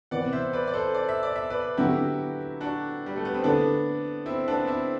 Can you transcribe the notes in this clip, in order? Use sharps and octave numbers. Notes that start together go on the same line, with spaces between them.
C3 E3 B3 D5 F#5
C5 E5
B4 D5
D5
A4 C5
D5
E5
D5
E5
B4 D5
D3 F#3 B3 E4 F#4 G4
D4 F#4
G3
A3
B3
C4
D3 A3 B3 D4 E4
C4 E4
B3 D4
C4 E4